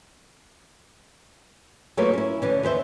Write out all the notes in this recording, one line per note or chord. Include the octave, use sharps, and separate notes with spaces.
F#3 A3 A#3 F4 B4 C#5
C#4 E4
D2 D3 E3 C#4
D#2 B4 C5 E5